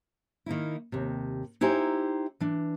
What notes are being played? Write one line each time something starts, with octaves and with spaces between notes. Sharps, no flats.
D#3 A#3 D#4 E4
D#2 C3
D#4 E4 G4 C5 G#5 A#5
E3 D4